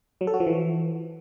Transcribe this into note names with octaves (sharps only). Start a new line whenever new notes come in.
F#3
A4
F#4
F3
E3